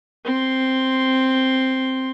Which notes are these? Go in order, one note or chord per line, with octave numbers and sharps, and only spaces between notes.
C4 C6